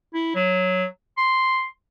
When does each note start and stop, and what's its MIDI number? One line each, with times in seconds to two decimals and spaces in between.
0.14 0.33 64
0.35 0.85 54
1.18 1.66 84